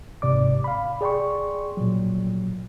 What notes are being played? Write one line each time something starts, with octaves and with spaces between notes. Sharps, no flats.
G1 G#2 C3 D5 D6
F5 B5
G#4 D5 G5 C6 C#6
A#2 F#3